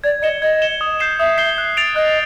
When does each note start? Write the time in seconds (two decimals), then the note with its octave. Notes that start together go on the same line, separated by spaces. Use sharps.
0.04 D5 G#6
0.22 D#5 C#7 E7 G7
0.42 D#5 G#6
0.62 C#7 E7 G7
0.81 D#6
0.99 G6 C7 E7 G7
1.19 E5 D#6
1.38 G6 C7 E7 G7
1.58 F#6
1.77 A6 D7 F7
1.96 D#5 F#6